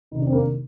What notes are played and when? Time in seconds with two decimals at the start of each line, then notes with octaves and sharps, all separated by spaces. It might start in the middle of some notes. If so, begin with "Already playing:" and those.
0.11 C3 D#3 D#4
0.19 D4
0.26 C4
0.32 A#3 D4